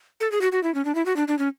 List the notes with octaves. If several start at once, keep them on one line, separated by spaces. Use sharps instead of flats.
A4
G#4
F#4
F#4
E4
C#4
D4
E4
F#4
D4
D4
C#4